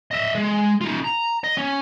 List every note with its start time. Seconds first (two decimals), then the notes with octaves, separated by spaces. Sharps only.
0.11 D#5 E5
0.35 G#3
0.81 D#4 F4
1.04 A#5
1.44 D#5
1.57 C#4